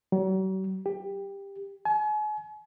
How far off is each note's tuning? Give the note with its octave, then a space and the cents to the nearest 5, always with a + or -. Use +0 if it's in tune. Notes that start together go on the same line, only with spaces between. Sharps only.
F#3 +45
G4 +15
G#5 +40